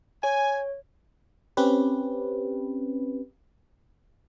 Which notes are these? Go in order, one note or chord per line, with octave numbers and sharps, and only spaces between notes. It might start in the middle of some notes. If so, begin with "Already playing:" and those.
C#5 G#5
C4 C#4 G4 B4